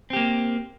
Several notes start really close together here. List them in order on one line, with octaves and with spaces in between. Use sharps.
C4 G4 A#3